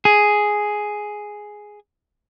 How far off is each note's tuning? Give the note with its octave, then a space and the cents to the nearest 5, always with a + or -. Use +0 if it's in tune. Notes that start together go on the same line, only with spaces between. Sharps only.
G#4 +5